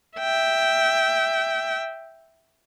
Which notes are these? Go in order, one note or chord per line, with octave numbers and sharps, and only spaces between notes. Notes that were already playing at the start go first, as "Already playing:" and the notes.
E5 G5